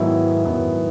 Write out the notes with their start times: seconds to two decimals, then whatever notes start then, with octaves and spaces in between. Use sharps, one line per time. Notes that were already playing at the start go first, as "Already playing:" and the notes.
Already playing: G#2 D#3 F#3 B3 E4
0.44 G#2 D#3 F#3 B3 E4